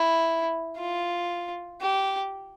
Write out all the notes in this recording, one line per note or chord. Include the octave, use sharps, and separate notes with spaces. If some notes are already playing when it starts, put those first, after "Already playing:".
Already playing: E4
F4
G4